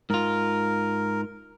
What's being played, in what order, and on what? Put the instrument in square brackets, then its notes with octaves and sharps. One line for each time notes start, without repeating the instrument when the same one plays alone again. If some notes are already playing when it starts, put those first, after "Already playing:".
[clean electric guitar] G#2 F4 [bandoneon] A#4